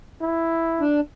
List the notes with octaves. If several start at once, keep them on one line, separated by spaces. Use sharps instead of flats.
E4
D4